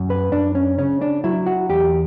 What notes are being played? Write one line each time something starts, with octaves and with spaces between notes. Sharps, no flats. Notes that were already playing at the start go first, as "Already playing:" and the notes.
Already playing: F#2
B4
F#2 D4
C#4
C#3 C#4
D4
F#3 E4
F#4
E2 G4